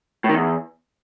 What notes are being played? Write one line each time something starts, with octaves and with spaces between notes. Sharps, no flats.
A2
D#3
E2